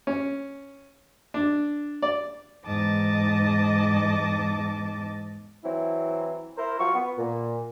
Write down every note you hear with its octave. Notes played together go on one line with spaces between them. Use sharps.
C#4
D4
D5
E2 G#2 D#5 A5 D6
E3 F#3 C4 E4
E4 A#4 C5
F#3 F4 C#6
B3
A#2